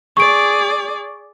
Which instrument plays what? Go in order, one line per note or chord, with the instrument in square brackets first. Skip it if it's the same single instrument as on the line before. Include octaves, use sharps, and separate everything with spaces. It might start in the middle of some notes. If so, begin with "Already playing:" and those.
[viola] G#4 D5 [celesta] C#6 D7